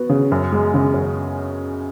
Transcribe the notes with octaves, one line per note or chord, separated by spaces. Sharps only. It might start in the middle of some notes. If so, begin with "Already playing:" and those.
Already playing: B3 F#4
C#3
F#2
G#3
C#3
F#2